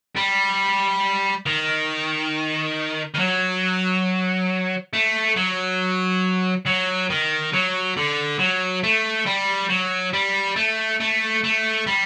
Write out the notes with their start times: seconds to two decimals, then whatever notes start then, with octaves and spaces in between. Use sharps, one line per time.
0.16 G3
1.46 D#3
3.15 D#3
3.19 F#3
4.93 A3
5.36 F#3
6.66 F#3
7.10 D#3
7.53 F#3
7.97 D3
8.39 F#3
8.83 A3
9.26 G3
9.70 F#3
10.13 G3
10.56 A3
11.00 A3
11.44 A3
11.87 G3